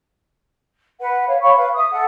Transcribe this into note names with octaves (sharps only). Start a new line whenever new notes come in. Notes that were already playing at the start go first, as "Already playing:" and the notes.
B4 F#5
C#5 F5
C#5 F5 B5 C#6
B4 F5
E5 D#6
A4 F#5